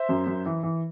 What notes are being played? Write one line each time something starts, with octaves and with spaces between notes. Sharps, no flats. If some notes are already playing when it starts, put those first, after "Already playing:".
Already playing: C5 E5
F#2
F#2
E3
E3